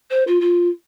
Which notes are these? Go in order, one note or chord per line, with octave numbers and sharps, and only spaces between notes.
C5
F4
F4